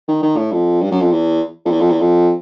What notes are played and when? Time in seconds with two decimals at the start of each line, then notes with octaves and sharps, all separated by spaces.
0.08 D#3
0.22 D#3
0.37 A2
0.52 F2
0.82 G2
0.91 F#2
1.01 F2
1.11 E2
1.65 F2
1.70 E2
1.80 F2
1.90 E2
2.00 F2